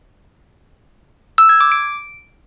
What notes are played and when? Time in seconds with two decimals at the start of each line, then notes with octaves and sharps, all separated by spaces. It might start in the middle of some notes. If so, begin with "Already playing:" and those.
1.38 E6
1.49 G#6
1.60 D6
1.72 D7